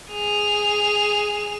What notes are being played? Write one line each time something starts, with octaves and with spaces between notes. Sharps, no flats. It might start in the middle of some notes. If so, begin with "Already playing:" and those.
G#4 F7